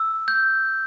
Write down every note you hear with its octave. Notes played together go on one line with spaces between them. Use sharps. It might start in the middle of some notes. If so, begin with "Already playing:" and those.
Already playing: E6
G6